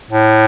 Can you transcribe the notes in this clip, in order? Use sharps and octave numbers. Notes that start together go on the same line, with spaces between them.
A2